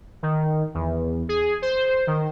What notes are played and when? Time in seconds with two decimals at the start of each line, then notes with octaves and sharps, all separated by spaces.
0.23 D#3
0.74 E2
1.29 G#4
1.62 C5
2.07 D#3